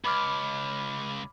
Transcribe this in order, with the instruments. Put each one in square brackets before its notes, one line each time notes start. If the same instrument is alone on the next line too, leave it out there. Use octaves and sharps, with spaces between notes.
[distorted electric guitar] C#2 [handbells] B5 D6 F6